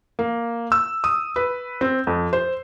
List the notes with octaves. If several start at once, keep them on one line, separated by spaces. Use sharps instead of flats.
A#3
E6
D#6
B4
C4
F2
C5